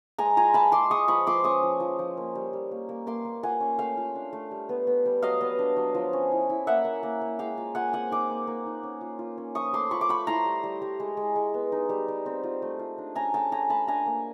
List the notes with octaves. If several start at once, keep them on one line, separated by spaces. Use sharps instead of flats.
G#3 G#5 A#5
F4 G#5 A#5
F4 A5 B5
G#3 C6 D6
G#3 C#6 D#6
F3 B5 C#6
F3 C6 D6
C#4 C#6 D#6
F3
F3
F3
A#3
G3
G3
A#3
A#3
A#3 C6 D6
A#3
F4 F#5 G#5
C#4
A3 F5 G5
F4
D4
A3
G3
B3
B3
G3
F#3 D#5 F5
B3
D4
F#3
F3
C#4
E4
E4
A#3 E5 F#5
A#3
A#3
A#3
G#3 F5 G5
F4
F4 F#5 G#5
C4 F#5 G#5
D#4 C6 D6
A#3
A#3
D#4
C#4
F4
F4
C#4
F3 C#6 D#6
A3 C6 D6
F4 B5 C#6
D6
A3 B5 C#6
E4 A#5 C6
G3
G3
G3
G#3
G#3
G#3
B3
D#4
G3
G3
C4
F4
A3
F4
D4
C#4 G#5 A#5
A3 G5 A5
A3 G#5 A#5
A3 A5 B5
D4 G#5 A#5
A#3